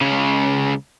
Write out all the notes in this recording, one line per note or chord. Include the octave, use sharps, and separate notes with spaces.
C#2 C#3